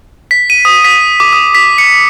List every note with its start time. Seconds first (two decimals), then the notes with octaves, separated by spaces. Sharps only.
0.31 B6
0.50 D#7
0.65 D#6
0.84 B6
1.20 D6
1.33 D#6
1.55 B6
1.78 C#7